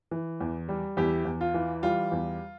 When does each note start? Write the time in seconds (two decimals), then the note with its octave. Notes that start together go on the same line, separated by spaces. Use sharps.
0.11 E3
0.41 E2
0.69 G3
0.97 E2 E4 G4
1.25 E2
1.41 F4
1.54 E3
1.83 G3 F4
2.12 E2